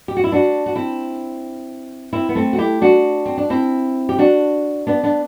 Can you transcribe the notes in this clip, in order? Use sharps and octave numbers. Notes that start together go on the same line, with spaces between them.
G4
F#4
E4
D4 F#4
F#4
C4 E4
C4 E4
B3
A3 C4
F#4
E4 G4
D4 F#4
C4
D4
C4 E4
G4
D4 F#4
B3 D4
B3 D4